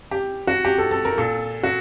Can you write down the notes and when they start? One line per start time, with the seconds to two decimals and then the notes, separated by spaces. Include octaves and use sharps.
0.11 G4
0.47 F#4
0.65 G4
0.78 A4
0.91 A4
1.05 A#4
1.18 A#2 A4
1.63 F#4